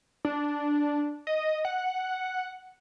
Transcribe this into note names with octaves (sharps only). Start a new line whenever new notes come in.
D4
D#5
F#5